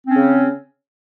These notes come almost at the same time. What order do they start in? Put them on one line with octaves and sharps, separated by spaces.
C4 C#4 C#3